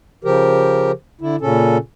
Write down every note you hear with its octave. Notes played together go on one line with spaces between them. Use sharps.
C#3 F3 G4 A#4
D3 E4
A#2 C#3 C#4 A4